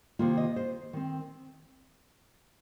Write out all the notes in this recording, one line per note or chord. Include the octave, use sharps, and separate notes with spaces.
C3 D#3 A#3 F4
D#5
C5
D#3 C4